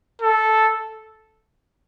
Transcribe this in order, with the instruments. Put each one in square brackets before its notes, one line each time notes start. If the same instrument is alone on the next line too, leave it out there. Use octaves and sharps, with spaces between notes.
[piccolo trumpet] A4